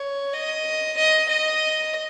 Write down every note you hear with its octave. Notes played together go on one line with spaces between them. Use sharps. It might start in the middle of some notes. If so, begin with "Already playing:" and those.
Already playing: C#5
D#5
D#5
D#5